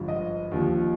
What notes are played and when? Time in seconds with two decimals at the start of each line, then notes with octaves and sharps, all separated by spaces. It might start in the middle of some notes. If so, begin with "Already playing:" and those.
Already playing: G#1 G2 D3 F3
0.08 D#5
0.51 D#2 D3 F3